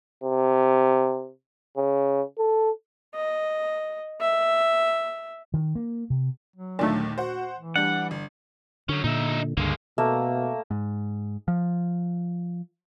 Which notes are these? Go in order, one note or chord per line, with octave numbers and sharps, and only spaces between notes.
C3
C#3
A4
D#5
E5
D#3
A#3
C3
F#3
D#2 A#2 D3 D#3 A3
F#4 C5 F#5
E3
G3 D4 F#5
G1
D3 F#3 C#4
A#2 D3 D#4 E5
C#2 G2 D3 G#3 A#3
B2 A3 A#3 E5
G#2
F3